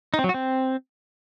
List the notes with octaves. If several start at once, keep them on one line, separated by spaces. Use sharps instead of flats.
D#4
C4
F#3
F#4
C4